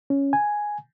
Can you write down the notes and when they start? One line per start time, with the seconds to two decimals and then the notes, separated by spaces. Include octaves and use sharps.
0.10 C#4
0.33 G#5